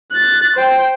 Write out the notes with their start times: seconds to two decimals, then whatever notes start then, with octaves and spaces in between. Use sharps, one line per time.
0.12 F#6 A6
0.56 C5 G5